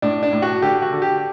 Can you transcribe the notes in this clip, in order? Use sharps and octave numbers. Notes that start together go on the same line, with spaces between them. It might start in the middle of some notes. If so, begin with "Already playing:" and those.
A2 D4
D4
A2
F#4
D3 G4
F#4
D3
G4